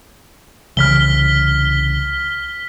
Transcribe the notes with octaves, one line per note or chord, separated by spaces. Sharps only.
C2 C#3 E3 F6 B6 G7